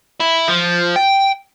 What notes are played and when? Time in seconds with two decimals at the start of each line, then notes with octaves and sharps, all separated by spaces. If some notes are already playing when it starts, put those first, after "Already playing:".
0.20 E4
0.48 F3
0.96 G5